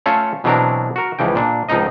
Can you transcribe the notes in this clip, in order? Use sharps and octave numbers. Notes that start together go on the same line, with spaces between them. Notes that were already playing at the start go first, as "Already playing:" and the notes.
A3 C#4 F4 A4 C#5
B2 E3 F#3 C4 D4 A#4
F#4 A#4
C#2 E3 F3 G5
A#2 D4
C#2 F3 C4 D#4 D#5